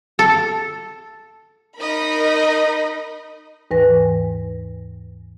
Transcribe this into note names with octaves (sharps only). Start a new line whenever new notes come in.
A4
D#4 A#4 D#5 B5
D#2 G#2 E3 B4 G#5 A#6